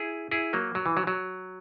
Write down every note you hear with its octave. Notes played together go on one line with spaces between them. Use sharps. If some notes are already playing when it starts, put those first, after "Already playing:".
Already playing: E4 G#4
E4 G#4
F#3 A#3
F#3
E3
F#3
F#3